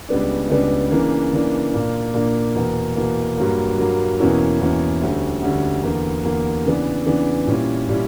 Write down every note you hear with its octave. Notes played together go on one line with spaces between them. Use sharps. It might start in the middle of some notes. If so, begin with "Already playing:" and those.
C#2 C#3 G3 B3 D4
C#2 C#3 G3 B3 D4
C#3 E3 A#3 D4
C#3 E3 A#3 D4
A#2 A#3 D4
A#2 A#3 D4
E2 B2 A#3
E2 B2 A#3
G2 F#3 A#3
G2 F#3 A#3
E2 B2 A#3 C#4 E4
E2 B2 A#3 C#4 E4
D2 D3 G3 C#4
D2 D3 G3 C#4
E2 D3 A#3
E2 D3 A#3
C#3 E3 B3 D4
C#3 E3 B3 D4
A#2 G3 C#4 E4
A#2 G3 C#4 E4